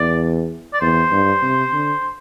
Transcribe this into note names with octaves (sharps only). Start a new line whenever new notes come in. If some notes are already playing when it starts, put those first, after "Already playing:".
Already playing: E2 D5
D5
E2 C5
G2
C3
D3